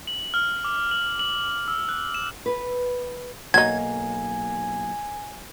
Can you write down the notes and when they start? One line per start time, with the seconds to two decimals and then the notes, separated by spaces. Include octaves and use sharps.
0.07 F#7
0.34 F6
0.65 D6
0.91 F#7
1.19 F#7
1.68 E6
1.89 F#6
2.14 E7
2.46 B4
3.54 B1 F#3 A#3 D#4 G#5 G#6